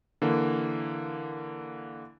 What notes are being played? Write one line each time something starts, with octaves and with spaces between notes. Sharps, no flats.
D3 E3 A#3